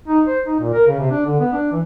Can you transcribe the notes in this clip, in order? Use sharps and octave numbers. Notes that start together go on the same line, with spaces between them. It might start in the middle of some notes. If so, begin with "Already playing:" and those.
D#4
C5
D#4
A#2
A#4
C#3
C3
D4
D3
B3
D4
E3